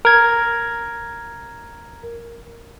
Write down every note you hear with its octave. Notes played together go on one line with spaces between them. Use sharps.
A#4 G#6